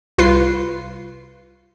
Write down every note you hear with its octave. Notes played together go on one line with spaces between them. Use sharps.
C2 F4 B4 C7